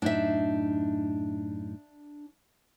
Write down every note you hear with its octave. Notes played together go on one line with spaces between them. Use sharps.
F#2 A2 D4 D#4 E5